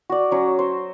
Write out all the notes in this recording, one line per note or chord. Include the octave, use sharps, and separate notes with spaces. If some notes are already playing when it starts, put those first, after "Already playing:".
F#4 D5
F#3 C#4
C5